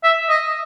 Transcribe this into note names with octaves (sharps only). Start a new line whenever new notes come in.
E5
D#5